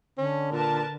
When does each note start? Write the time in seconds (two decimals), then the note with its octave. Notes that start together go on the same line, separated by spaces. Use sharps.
0.18 D3 C#4
0.52 A#2 A#4 B4 A5